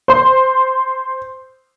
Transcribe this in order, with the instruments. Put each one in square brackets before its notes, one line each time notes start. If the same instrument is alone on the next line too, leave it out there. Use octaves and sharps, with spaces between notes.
[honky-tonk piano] C5 C6